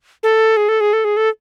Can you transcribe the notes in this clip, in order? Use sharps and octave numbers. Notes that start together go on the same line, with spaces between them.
A4
G#4
A4
G#4
A4
G#4
A4